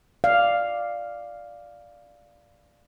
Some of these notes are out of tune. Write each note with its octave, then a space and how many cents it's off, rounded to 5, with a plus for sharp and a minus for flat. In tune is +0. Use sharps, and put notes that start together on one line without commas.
D5 +0 F5 +0